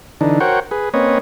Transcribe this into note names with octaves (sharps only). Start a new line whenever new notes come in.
D3 E3 D4 D#4
F#4 A#4 C5 C#5 F#5 G5
G#4 B4
A#3 C4 C#4 B4 C#5 D#5